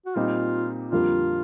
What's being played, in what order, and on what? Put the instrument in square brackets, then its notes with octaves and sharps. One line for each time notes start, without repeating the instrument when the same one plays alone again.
[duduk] F#4
[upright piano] A#2 G3 C4 D#4 [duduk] F4
[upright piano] F2 D3 G3 A#3 [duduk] F4